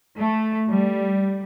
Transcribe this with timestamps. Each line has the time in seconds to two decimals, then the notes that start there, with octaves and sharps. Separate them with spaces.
0.18 A3
0.69 G3